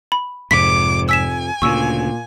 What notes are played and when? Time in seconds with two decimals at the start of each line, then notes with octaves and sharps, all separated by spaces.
0.12 B5
0.51 F1 F2 G#2 C3 D6 B6 D7
1.09 G#5 E6 B6 E7
1.62 D2 A#2 C#3 C#6 E6